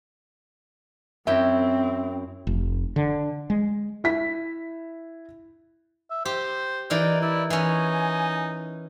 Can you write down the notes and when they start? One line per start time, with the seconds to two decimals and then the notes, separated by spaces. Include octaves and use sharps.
1.27 F#2 C4 E4 E5 G5
2.47 F1
2.96 D3
3.50 G#3
4.04 E4 B6
6.10 E5
6.25 G4 C5
6.90 E3 D#4 A#4 D5
7.22 E4 D5
7.50 E3 C#4 D#4 G#5